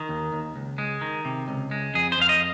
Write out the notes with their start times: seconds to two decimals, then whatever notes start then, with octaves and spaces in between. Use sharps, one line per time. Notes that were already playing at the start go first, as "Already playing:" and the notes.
Already playing: D#3
0.09 D#2
0.33 D#2
0.56 C#2
0.78 G#3
1.01 D#3
1.25 C3
1.48 C#2
1.71 G#3
1.94 F2 G#4
2.12 C5
2.18 F2 F5
2.29 D#5